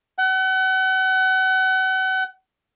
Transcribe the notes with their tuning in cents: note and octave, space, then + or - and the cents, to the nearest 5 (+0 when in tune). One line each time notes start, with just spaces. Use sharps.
F#5 +35